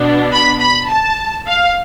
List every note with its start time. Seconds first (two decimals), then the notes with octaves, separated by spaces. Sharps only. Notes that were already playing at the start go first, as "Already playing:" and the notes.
Already playing: B2 B3 D4
0.32 B5
0.60 B5
0.89 A5
1.47 F5